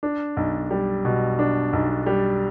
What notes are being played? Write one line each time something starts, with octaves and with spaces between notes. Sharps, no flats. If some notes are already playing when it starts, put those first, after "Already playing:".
D4
B1
G3
B2
D4
B1
G3